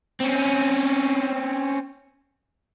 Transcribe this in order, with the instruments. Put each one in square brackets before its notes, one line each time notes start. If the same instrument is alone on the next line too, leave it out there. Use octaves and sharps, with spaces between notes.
[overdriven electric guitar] C4 C#4